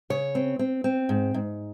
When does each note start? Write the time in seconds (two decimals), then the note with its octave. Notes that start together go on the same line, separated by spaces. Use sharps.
0.10 C#3 C#5
0.35 C4
0.59 C4
0.84 C4
1.09 G#2
1.34 G#2